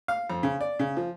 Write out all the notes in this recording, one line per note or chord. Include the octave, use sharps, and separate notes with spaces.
F5
F2
C#3
D5
C#3
F3